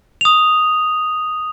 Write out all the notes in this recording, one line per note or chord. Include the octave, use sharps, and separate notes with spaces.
D#6 F7